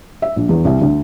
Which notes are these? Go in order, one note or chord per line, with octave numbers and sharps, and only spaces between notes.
E5
A#1
E2
C2
D2